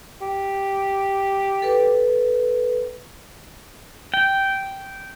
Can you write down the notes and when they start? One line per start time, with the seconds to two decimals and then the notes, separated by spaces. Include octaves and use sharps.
0.22 G4
1.62 A4 B4
4.14 G5